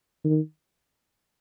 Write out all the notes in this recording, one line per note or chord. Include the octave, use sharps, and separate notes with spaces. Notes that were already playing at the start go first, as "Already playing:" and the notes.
D#3